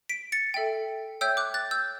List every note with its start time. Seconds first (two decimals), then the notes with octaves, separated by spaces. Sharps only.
0.09 B6 D7
0.32 A6 C#7
0.54 A4 E5 G5
1.21 C#5 E5 G5 E6 G6
1.37 D6 F#6
1.54 F#6 A6
1.71 E6 G6